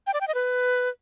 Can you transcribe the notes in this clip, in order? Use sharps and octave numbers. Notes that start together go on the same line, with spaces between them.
G5
D5
G5
D#5
B4